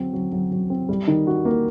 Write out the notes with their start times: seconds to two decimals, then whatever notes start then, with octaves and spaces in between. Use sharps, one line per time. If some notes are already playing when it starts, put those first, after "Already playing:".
Already playing: F#3 C4
0.13 F#3
0.32 F#3
0.51 F#3
0.70 C4
0.89 G3
1.08 D#3
1.27 F#4
1.45 A#3